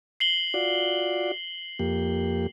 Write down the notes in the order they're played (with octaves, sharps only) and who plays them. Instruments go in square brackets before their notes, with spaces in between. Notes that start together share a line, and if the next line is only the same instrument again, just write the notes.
[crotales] C7 F#7 G7
[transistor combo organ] F4 F#4 D5
F2 A#3 G4